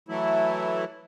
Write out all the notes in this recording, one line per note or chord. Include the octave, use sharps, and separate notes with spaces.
E3 F#3 A3 E4